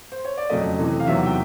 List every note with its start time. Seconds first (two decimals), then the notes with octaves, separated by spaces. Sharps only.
0.12 C5
0.25 C#5
0.37 D5
0.49 F2 C#3 F#3 A3 D#5
0.78 C3 E3 A3
1.00 F5
1.07 E2 C3 D#3 F#3 E5
1.17 F#5
1.26 G5